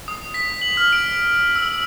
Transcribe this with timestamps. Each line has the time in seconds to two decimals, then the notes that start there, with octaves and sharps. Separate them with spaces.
0.08 D#6
0.34 B6
0.62 F#7
0.77 F6
0.93 D7
1.55 E6